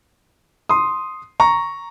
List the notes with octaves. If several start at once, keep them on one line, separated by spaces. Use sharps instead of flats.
C6 D#6
A#5 C#6